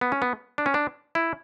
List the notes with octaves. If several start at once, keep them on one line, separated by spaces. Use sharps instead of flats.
B3
C#4
B3
D4
C#4
D4
E4